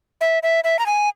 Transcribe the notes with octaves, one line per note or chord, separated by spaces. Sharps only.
E5
E5
E5
A#5
G#5